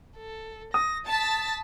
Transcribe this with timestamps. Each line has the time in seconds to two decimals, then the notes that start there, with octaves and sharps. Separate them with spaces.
0.17 A4
0.74 D#6 A#6
1.07 A5 A6 B6